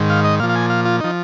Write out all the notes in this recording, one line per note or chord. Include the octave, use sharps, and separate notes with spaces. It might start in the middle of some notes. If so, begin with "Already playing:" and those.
Already playing: G#2 D#3
F5
D#5
A#2 F3 F5
F5
G#5
F5
F4
F3 D#4